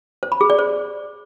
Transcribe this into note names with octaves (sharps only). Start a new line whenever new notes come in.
C5
B5
G#4
D5
C5